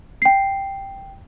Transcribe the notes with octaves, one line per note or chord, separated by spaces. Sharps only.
G5 C7